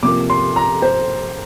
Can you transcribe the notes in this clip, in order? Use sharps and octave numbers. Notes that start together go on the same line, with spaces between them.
C3 F3 A#3 D6
C6
A#5
C5